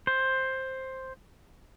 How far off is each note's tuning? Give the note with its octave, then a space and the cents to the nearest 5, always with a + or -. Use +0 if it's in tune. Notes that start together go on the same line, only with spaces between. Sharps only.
C5 +10